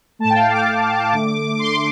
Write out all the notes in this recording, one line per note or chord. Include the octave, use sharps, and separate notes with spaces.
A2 A3 A5
G5
F5
D6
D3 A3
C6